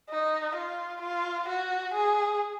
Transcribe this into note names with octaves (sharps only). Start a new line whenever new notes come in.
D#4
F4
F4
F#4
G#4